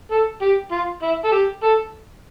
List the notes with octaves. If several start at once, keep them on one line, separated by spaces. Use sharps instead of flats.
A4
G4
F4
E4
A4
G4
A4